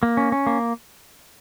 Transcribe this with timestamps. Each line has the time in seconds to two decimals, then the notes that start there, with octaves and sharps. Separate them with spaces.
0.03 A#3
0.17 C#4
0.32 C#4
0.47 A#3